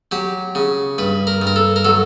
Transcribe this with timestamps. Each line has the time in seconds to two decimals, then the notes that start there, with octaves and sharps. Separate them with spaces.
0.11 F#3 G4
0.55 C#3
0.98 G2 B4
1.27 A#4
1.42 G2
1.47 A#4
1.56 A4
1.76 A#4
1.85 F#3 A4